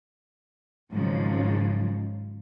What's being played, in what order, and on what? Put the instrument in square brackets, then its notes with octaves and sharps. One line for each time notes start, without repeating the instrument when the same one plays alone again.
[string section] G#1 G#2 C#3 F3 F#3